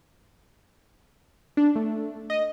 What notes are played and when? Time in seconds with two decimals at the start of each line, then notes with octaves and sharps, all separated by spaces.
1.57 D4
1.76 A3
2.30 D#5